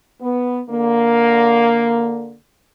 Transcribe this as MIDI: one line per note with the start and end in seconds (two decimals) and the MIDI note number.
0.21 0.60 59
0.69 2.34 50
0.69 2.34 58